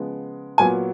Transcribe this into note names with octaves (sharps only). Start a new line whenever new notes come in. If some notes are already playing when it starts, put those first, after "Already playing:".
Already playing: C#3 F3 G#3 B3
A#2 F#3 B3 G#5